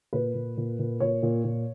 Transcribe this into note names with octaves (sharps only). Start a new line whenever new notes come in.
A#2 B4
A#2
A#2
A#2
A#2 C#5
A#2
A#2